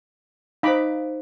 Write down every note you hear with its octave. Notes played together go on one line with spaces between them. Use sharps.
D#4 C5 F5 B5 D6